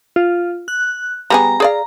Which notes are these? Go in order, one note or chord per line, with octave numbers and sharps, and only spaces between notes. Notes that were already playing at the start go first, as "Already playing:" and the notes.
F4
F#6
G3 B3 G#4 A#5
G#4 D5 F5